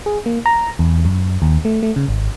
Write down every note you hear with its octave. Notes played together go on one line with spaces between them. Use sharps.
G#4
A#3
A#5
E2
F#2
D#2
A3
A3
C#3
G#1